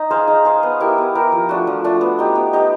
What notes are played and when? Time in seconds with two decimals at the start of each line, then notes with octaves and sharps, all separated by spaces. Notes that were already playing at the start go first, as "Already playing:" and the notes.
Already playing: D#4
0.10 G#4 C5 F5
0.28 D#4
0.45 G#4 C5 F5
0.63 B3
0.80 E4 G4 A#4
0.98 B3
1.15 E4 G4 A#4
1.32 F3
1.49 A3 D4 F#4
1.67 F3
1.84 A3 D4 F#4
2.01 B3
2.19 D#4 G4
2.35 B3
2.53 D#4 G4